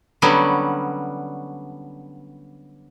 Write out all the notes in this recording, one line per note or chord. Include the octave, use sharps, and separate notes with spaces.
D3 F#3 G3 B3 C#4